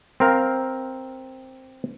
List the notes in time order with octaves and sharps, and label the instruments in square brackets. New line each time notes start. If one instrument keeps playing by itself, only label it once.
[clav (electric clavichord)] C4 A#4 F5